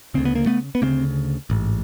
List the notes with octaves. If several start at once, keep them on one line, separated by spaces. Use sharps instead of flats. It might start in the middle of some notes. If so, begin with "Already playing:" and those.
D2 C#3 C4
B3
A#3
A3 B3
B3
D2 C#3 A#3 C4
A1 G#2